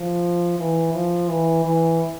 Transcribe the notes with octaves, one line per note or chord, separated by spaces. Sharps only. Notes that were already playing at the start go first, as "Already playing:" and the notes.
Already playing: F3
E3
F3
E3
E3